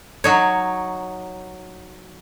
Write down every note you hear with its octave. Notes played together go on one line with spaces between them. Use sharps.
F#3 D#4 C#5